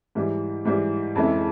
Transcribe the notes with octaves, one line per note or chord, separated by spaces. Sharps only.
G#2 E3 G3
G#2 E3 G3
F2 C#3 E3 G#3 E4